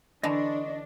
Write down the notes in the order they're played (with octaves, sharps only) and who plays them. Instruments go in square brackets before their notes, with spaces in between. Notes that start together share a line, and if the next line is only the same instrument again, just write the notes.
[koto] D3 E3 [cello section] D4 [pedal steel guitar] D#5 C6 C#6